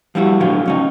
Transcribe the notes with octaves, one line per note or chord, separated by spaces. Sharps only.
F3 G3 E4 F#4
A2 D3 F3 F#3 F4
C#2 C#4 D#4